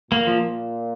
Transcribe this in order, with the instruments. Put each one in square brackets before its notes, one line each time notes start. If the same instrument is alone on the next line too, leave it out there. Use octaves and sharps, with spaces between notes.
[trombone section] A#2 [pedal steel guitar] A#3
[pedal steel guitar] F3